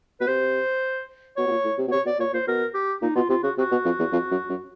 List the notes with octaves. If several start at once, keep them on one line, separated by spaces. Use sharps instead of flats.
B2 B4
C3 C5
B2 C#5
B2
A#2
A2
C3
B2
C3 C#5
B2 D5
A#2 C#5
A#2 C5
B2 A#4
G4
A#2 D#4
B2 F4
C3 F4
C#3 F#4
C3 F#4
B2
F2
E2
F2
F#2
F#2